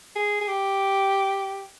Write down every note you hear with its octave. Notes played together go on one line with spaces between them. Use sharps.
G#4
G#4
G4